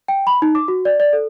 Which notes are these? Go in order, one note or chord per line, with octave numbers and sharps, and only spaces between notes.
G5
B5
D#4
D6
F#4
D5
D5
A4